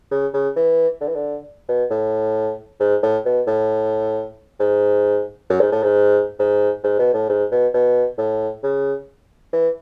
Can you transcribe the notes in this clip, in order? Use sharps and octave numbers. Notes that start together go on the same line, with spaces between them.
C#3
C#3
E3
D3
E3
D3
B2
A2
G#2
A2
B2
A2
G#2
F#2
G#2
A2
G#2
G#2
G#2
B2
A2
G#2
B2
B2
A2
C#3
E3